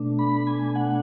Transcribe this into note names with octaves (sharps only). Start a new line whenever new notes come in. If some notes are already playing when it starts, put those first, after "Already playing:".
Already playing: B2 A3 D4
B5
G#5
F#5